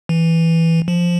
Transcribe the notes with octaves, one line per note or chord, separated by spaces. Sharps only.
E3
F3